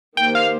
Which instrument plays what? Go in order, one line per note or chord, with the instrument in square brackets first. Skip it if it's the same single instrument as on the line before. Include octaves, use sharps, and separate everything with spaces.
[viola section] D#3 A#3 G4 C5 [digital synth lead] G5
[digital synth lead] F5